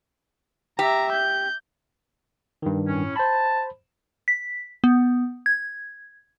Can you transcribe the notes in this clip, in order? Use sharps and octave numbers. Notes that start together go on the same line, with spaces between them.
G4 E5 A#5
G6
G2 D#3
A2 C#4
C5 A5 B5
B6
B3
G#6